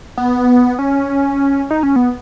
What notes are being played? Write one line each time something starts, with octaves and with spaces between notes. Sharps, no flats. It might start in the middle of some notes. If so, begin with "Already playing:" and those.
B3
C#4
D#4
C#4
B3